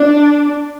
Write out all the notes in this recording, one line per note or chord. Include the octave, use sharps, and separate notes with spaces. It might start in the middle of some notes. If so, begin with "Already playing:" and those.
Already playing: D4